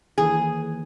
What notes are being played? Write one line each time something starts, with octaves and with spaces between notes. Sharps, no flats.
D#2 E3 G#4